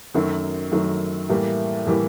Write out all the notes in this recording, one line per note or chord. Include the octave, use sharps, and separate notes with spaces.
F#2 D#3 F#3 A3
F#2 D#3 F#3 A3
A2 E3 G3 A#3
A2 E3 G3 A#3